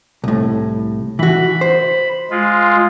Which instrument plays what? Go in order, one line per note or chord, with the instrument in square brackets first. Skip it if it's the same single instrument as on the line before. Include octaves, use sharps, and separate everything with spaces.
[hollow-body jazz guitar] C2 A2
[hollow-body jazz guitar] E3 F#4 [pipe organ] B5
[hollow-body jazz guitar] C5
[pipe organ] G#3 F4